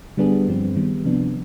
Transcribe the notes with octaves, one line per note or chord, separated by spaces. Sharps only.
D3 G3 B3 D4 G#4
G2 F3 C4
D#3 G3 B3
C3 F3 B3 D4